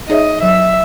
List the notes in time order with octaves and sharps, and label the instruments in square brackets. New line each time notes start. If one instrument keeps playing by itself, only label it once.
[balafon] D#4 G#4 C#5 E5 [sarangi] D#5
[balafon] F#3 [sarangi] E5